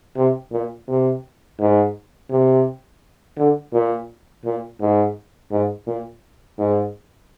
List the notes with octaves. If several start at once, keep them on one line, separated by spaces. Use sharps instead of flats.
C3
A#2
C3
G#2
C3
D3
A#2
A#2
G#2
G#2
A#2
G#2